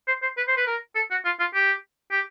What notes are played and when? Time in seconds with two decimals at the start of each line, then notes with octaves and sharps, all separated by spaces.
0.07 C5
0.22 C5
0.37 B4
0.48 C5
0.57 B4
0.67 A#4
0.95 A4
1.11 F#4
1.25 F4
1.40 F4
1.54 G4
2.11 G4